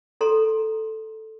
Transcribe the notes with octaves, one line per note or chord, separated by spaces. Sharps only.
A4 A#5 C6